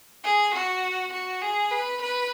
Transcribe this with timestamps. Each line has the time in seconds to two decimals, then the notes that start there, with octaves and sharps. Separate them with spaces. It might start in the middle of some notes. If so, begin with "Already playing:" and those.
0.24 G#4
0.54 F#4
1.12 F#4
1.41 G#4
1.71 B4
2.01 B4